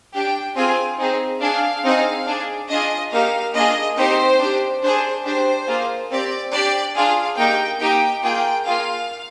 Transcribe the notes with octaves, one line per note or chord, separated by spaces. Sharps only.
D4 G4 G5
C4 F4 G#4 G#5
C4 D#4 G#4
D4 G#4 F5
C4 D#4 G#4
D4 G#4
D4 F4 G#4 D#5
A#3 D#4 G4 F5
A#3 D4 F4 G#4 D#5
C4 D#4 G4 C5
D4 G4
D4 G#4 C5
D4 G4 C5
A#3 F4 G#4
C4 G4 D5
D4 G4 D5
D4 F4 G#4 F5
A#3 D#4 G4 G5
A#3 D#4 G4 G5
A#3 F4 G#4 G5
A#3 F4 G#4 F5